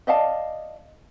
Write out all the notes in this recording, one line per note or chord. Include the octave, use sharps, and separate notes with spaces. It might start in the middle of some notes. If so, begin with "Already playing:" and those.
D5 D#5 F5 A5